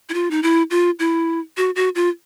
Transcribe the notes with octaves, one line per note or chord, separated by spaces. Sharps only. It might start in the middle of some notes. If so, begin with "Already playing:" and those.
E4
F4
D#4
E4
F4
E4
F#4
F#4
F4